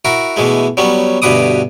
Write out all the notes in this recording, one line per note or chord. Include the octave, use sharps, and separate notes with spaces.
E4 F#4 A#4
B2 E3 G#3 A3
F#3 G3 B3 C#4
D2 G2 B2 B4 D6 D#6